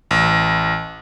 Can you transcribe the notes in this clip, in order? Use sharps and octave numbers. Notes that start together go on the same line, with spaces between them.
A1